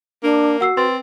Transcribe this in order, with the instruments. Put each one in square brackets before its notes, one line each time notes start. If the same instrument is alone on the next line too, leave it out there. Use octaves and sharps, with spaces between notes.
[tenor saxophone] A#3 [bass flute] D4
[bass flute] F#4 [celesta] F#5 E6 C7
[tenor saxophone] C4 [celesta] B4 C6 A6